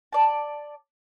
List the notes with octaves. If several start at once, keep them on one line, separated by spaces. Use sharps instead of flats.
D5 A5